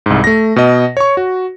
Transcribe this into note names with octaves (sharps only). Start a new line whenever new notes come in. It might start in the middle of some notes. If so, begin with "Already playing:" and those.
C2 G#2
A3 A#6
B2 D#5
C#5 C#6
F#4